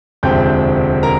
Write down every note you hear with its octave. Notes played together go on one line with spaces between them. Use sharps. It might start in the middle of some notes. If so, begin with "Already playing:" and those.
E1 D2 C3 F3 C4 G5 G6
A#4 A#5